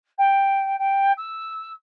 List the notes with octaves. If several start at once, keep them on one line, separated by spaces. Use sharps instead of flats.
G5
G5
E6